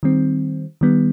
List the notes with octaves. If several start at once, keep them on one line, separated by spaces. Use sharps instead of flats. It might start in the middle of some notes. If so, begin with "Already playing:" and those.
D#3 G3 C4
D#3 G3 B3